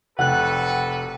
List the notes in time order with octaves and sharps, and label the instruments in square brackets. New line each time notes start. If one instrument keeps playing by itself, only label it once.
[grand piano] F1 [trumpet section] F#4 A4 B4 [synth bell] F#5 F#6 [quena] G5